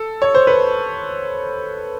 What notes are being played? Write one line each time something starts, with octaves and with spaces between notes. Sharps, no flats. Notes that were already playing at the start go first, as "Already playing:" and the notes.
Already playing: A4
C#5
C5
B4